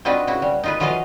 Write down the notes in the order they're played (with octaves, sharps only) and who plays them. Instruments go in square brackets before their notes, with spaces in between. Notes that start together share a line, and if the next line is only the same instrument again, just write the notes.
[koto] C4 D4 D#4 F4 F#4 B4
C#3 E4 F#4
G3
D#4 F4 B4
E3 F#3 F4 B4 D#5 F5